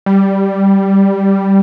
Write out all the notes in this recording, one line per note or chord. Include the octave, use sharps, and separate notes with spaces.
G3